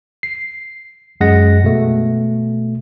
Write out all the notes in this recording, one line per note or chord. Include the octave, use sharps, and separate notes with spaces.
C7
F#2 G#3 G#4 F#5 A#6
B2 A3